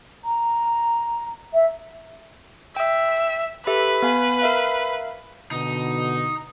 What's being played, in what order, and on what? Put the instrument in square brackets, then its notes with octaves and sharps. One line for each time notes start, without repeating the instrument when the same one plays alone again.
[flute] A#5
E5
[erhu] E5 [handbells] G5
[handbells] G4 A4 E5 [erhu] B4
[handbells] B3 F5 G#5
A#4 E5 F5
[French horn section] B2 D3 [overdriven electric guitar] D#4